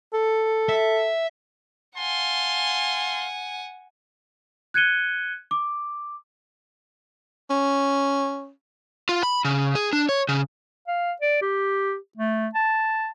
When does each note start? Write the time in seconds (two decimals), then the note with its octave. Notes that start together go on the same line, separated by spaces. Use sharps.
0.13 A4
0.69 E5
1.97 F5 F#5 G#5 A5 C6
4.74 F#6 G#6 C#7 D#7 G7
5.51 D6
7.50 C#4
9.09 F4
9.23 B5
9.45 C#3
9.75 G#4
9.93 D4
10.09 C#5
10.29 C#3
10.87 F5
11.22 D5
11.42 G4
12.17 A3
12.55 A5